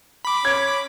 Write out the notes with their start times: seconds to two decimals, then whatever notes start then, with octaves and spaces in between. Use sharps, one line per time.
0.25 B5 D6
0.45 C#4 G#6